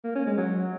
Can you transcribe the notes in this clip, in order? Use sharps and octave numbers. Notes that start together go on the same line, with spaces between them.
A#3
C#4
G#3
F#3